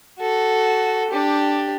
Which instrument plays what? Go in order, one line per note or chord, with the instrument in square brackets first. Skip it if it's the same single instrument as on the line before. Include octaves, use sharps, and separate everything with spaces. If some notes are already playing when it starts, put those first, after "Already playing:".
[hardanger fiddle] F#4 A4
D4 G4